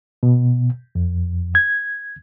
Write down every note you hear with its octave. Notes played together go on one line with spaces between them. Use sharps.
B2
F2
G#6